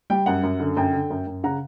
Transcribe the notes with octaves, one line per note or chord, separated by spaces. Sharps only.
G3 G5
F#2 F#5
F#2
D3
F#2 G5
D3
F#2
F#2
C#3 F#5 A#5